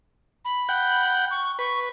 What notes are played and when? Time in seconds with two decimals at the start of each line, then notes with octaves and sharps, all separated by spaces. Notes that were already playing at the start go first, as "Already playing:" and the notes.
0.45 B5
0.69 F#5 G5
1.31 C#6
1.59 B4 C#6